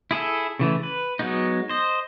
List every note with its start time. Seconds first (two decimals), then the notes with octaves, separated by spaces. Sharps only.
0.11 E4 G#4 A4 E5
0.59 C#3 E3 A3
0.83 B4
1.19 F#3 G#3 B3 D#4
1.69 C5 D#5